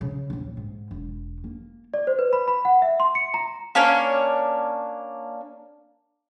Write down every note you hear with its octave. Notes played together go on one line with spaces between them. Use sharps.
C#3
D#1 C4
G#2
E1
A#3
D5
C5
B4
B5
B5
F#5
E5
C6
C#7
A#5
A#3 C#4 D4 C#5